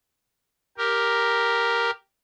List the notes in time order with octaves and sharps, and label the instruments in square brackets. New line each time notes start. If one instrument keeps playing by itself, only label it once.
[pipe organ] G4 A#4